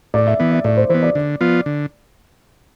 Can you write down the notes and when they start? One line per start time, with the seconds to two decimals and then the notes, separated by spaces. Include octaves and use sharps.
0.14 A2 D5
0.27 E5
0.39 E3 B3
0.51 E5
0.64 A2 D5
0.77 C5
0.89 E3 B3 C5
1.03 D5
1.15 D3
1.41 F3 B3 F4
1.66 D3